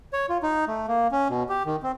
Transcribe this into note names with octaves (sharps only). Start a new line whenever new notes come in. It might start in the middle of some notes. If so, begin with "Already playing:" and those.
C#5
F4
D#4
A3
A#3
C#4
B2
G4
D#3
C4